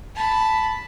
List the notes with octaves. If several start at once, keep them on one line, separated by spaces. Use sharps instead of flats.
A5 B5